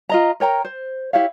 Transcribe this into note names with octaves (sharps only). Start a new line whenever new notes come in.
F4 D#5 A#5
A#4 C#5 G5 A#5
C5
E4 G4 C#5 F5